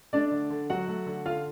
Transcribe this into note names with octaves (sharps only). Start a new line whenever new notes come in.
A3 D4 D5
D3
D3
F#3 F#4 F#5
A3
D3
D3 F4 F5